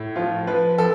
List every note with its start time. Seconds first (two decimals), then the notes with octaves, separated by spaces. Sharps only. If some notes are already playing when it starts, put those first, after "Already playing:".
Already playing: A2
0.16 F3 F4
0.47 F3 B4
0.78 F3 A4